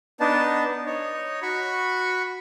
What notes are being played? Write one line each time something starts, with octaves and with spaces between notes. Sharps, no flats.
B3 D4 D#4 A5
D#4 C#5
F#4 B5 C#6